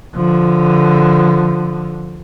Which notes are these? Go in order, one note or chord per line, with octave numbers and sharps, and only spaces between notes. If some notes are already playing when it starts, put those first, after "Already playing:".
D3 F3